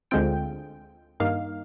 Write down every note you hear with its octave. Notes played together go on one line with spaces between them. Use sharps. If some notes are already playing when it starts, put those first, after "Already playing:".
D2 D3 G#3 C4 F4 G5
G2 D#3 A#3 D#4 F5